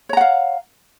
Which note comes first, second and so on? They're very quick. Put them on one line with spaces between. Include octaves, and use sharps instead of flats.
C#5 A#5 F#5 F5